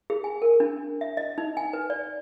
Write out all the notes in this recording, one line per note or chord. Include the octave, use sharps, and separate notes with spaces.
G#4
G#5
A#4
D4
E5
D#5
D#4
G#5
B4
D5